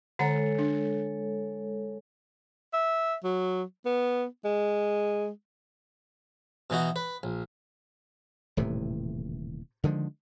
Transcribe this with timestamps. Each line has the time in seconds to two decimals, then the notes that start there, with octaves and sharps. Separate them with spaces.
0.19 D3 G#3 A4 C#5 F#5 A#5
0.59 D4
2.73 E5
3.24 F#3
3.85 B3
4.44 G#3
6.70 B2 E3 D#4 F#4
6.96 B4
7.23 A#1
8.57 D#1 A2 C3 E3
9.84 D3 D#3 F3 G#3